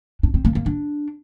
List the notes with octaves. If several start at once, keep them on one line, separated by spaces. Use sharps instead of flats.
D4
C4
A#3
A#3
D4